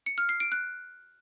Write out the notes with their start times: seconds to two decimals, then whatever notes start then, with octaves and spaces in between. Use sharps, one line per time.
0.06 C#7
0.18 F6
0.29 C7
0.40 D7
0.52 F#6